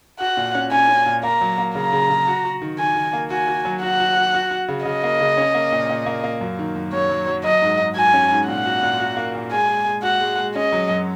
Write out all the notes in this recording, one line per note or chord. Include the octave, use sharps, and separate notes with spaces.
F#4 F#5
A#2
C#4
C#4 G#5
C#4
A#2
A#3 A#5
F#3
A#3
C#3 A#5
C#3
C#3
F#4
F#4
D#3
D#3 G#5
D#3
A#3
F#4 G#5
F#4
F#3
F#4 F#5
F#4
F#4
F#4
F#4
C#3
C#3 D#5
A#3
C#3
C#4
A#3
A#2
A#2
A#3
A#3
F#2
D#3
F#2
F#2 C#5
F#3
F#3
F#3 D#5
G#2
G#2
F#4 G#5
C#4
G#2
A#2 F#5
F#4
A#2
F#4
A#3
A#2
G#3 G#5
G#3
G#3
F#4 F#5
G#3
G#3
C#4 D#5
F#3
F#2